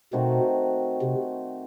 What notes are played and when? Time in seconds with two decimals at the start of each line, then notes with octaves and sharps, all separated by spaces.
0.13 B2 D#3 A3 C4 F#4
1.02 C3